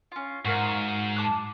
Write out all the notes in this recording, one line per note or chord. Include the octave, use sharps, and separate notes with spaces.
C#4 F4
G#2 F#4 A#4 F5
A5 D6 F#6